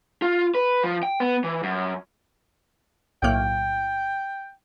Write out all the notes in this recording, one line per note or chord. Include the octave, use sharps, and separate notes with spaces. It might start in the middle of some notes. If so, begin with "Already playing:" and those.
F4
B4
F3
G5
B3
E3
F#2
B1 A2 A#3 G5